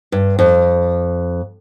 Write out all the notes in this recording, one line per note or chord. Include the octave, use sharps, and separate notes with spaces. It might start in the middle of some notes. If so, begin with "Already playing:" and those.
G2
F2